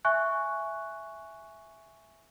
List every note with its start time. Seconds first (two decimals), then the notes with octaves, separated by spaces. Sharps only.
0.05 E5 G#5 C#6 F#6